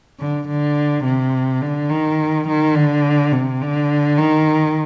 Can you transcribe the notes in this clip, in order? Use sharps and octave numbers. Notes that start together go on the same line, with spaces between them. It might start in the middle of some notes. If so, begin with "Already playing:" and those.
D3
D3
C3
D3
D#3
D#3
D3
C3
D3
D#3